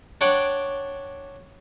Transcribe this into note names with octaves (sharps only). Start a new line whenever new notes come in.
D4 C#5 F#5 G5